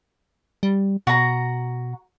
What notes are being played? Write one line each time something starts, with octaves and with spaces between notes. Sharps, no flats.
G3
B2 F#4 A#5